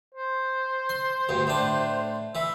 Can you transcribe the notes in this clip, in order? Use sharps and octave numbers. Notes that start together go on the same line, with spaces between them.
C5
C6
D2 G2
A2 D4
E3 E5